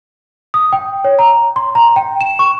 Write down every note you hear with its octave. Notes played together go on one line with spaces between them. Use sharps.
D#6
G5
C#5
A#5
C6
A#5
G5
E7
C#6